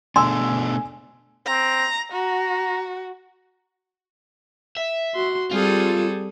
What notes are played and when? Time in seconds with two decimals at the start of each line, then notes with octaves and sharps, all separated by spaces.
0.16 B2 A3 D4 G#5 C6 E6
1.46 C4 A#5
2.13 F#4 A#5
4.77 E5
5.15 F#4 C6
5.51 G3 C4 F4 G#4 A4